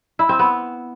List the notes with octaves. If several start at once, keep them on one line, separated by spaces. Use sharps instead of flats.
E4
C4
B3